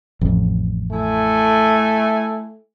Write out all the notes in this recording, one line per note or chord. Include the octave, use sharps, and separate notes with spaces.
A1 F2
A3 E4 G#5